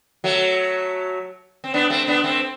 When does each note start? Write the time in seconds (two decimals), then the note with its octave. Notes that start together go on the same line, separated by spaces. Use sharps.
0.24 F#3 A3
1.64 C4
1.74 B3 D4
1.90 A3 C4
2.07 B3 D4
2.24 A3 C4